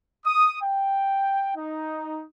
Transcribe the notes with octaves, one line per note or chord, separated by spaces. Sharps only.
D#6
G5
D#4